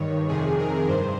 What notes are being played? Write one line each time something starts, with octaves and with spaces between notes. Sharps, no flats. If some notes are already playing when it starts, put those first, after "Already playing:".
Already playing: G2 D#3 C#5
F2 C3 D#3 G#4
A#4
G2 C5